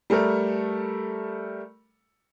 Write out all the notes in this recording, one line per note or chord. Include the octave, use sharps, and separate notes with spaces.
G3 A3 A4 A#4